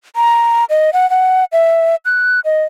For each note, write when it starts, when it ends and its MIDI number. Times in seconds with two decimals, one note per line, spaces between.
0.16 0.64 82
0.70 0.90 75
0.93 1.09 78
1.10 1.44 78
1.52 1.95 76
2.05 2.40 90
2.45 2.64 75